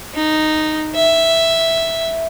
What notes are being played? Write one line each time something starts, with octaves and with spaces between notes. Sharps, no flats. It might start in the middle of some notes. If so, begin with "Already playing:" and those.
D#4
E5